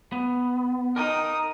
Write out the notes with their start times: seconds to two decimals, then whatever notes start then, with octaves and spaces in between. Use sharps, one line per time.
0.12 B3
0.96 D#4 A#4 G5 D#6